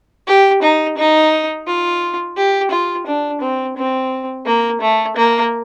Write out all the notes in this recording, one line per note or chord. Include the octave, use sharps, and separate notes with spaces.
G4
D#4
D#4
F4
G4
F4
D4
C4
C4
A#3
A3
A#3